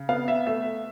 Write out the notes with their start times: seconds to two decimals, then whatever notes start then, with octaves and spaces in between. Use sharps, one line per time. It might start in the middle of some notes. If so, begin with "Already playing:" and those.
Already playing: C#3
0.09 B3 F5
0.28 E5
0.47 A3 E5